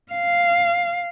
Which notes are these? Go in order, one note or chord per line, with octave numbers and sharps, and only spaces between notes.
F5